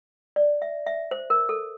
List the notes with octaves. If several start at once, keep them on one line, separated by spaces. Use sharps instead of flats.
D5
E5
E5
C5
A#4
A4